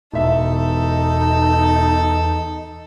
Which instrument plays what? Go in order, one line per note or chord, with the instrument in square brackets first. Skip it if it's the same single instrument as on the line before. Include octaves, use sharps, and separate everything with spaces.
[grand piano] E1 E5 [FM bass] E2 [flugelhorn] D#4 [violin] A4